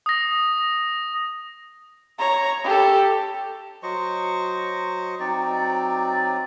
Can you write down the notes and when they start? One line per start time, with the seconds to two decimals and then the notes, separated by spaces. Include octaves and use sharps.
0.06 D#6 A#6
2.19 C#5 A#5
2.64 G4 A4
3.83 F#3 C5 D#5 C#6
5.20 F#3 C4 D#4 D5